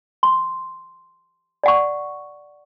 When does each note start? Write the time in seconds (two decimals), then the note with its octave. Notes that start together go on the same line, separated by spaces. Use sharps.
0.23 C6
1.64 D5 F#5 C#6